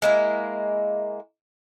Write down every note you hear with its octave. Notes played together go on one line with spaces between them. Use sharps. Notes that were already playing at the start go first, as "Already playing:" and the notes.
G#3 A#3 E4